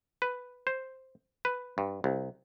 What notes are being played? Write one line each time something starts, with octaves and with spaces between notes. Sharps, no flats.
B4
C5
B4
G2
C2